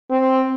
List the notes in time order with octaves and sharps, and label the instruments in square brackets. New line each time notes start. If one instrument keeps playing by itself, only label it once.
[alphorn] C4